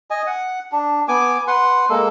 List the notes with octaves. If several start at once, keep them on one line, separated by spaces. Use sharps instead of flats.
D#5 G#5
F#5
D4
B3 G#5 D6
B4 F#5 C6
G#3 A#3 A4